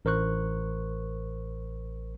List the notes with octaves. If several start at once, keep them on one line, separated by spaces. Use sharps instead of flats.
A1 A#4 C5 C#6 F#6